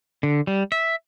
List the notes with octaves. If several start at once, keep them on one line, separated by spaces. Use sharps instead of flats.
D3
G3
E5